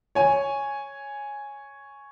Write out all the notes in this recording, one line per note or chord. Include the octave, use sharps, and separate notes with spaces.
C#5 G#5